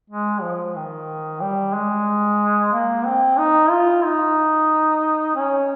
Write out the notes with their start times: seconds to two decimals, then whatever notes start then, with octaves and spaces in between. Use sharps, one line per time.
0.10 G#3
0.42 F3
0.75 D#3
1.42 G3
1.74 G#3
2.73 A#3
3.05 C4
3.38 D#4
3.71 F4
4.05 D#4
5.35 C#4